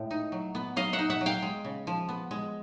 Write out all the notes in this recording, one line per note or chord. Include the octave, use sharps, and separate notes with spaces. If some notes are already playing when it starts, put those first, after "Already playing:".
Already playing: A2 G#3
D#4
F#3
B3
F#3 D#5 F5
E5 F#5
D#4
E5 F#5
F#3
F5 G5
G#3
C#3
F3
B3
G#3